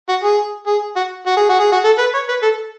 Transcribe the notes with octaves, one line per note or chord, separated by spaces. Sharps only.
F#4
G#4
G#4
F#4
F#4
G#4
F#4
G#4
F#4
A4
B4
C#5
B4
A4